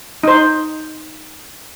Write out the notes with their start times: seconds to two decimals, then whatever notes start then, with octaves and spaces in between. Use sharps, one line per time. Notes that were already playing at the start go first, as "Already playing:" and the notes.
0.23 D#4 C5